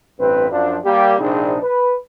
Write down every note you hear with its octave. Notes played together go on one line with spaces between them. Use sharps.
A1 G2 C4 B4
F#2 F3 D4
G3 A#3 G4
A#1 C3 C4 D4 D#4 G#4
B4